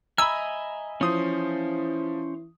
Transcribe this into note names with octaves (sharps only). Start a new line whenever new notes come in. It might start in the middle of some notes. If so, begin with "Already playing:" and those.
D#5 E5 G#5 A#5 B5 E6
E3 F3 C#4 C5 D#6